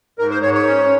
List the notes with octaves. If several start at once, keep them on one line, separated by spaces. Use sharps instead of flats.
G#2 A#4
C5
G#2 C#5
C#5
C#4